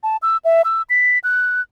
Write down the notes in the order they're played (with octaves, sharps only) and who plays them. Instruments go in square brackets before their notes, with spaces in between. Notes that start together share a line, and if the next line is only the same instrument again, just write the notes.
[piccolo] A5
E6
E5
E6
B6
F#6